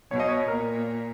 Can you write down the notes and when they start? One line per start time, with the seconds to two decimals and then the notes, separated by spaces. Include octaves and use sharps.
0.11 B2 C#5
0.20 D#5
0.28 C#5
0.48 A#2 A#4